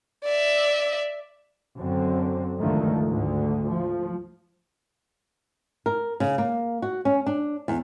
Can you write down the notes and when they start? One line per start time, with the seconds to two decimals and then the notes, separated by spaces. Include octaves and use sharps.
0.25 D5 E5
1.77 F#2 D3 C4
2.59 C#2 G2 D3 D#3 F3 A3
3.06 D2 G#2 D3
3.68 F3
5.86 A#4
6.20 C#3
6.38 A#3
6.82 F#4
7.05 C#4
7.27 D4
7.68 E2